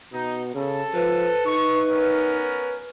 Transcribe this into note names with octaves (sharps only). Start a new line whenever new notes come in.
B2 D#4
C#3 A4
F3 B4
D#4 C#6
B3 C#4 A#4